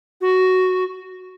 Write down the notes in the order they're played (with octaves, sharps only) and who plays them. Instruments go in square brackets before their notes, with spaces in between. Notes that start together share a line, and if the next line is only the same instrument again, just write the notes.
[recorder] F#4